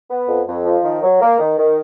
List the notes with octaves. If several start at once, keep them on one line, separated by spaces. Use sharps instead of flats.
B3
F2
F2
F3
D#3
F#3
A#3
D#3
D#3